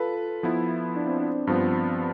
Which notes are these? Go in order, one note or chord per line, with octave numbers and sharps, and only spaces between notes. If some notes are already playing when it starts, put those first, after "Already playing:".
Already playing: F4 A4 B4
F3 B3 E4
D4
C4
D4
G2 F3 B3 C4